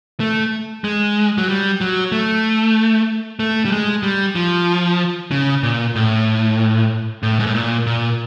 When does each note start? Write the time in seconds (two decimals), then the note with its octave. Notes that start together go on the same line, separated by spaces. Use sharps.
0.20 A3
0.84 G#3
1.38 F#3
1.49 G3
1.81 F#3
2.12 A3
3.39 A3
3.65 G3
3.72 G#3
4.03 G3
4.35 F3
5.31 C#3
5.63 A#2
5.95 A2
7.23 A2
7.40 G#2
7.46 A2
7.55 A#2
7.87 A#2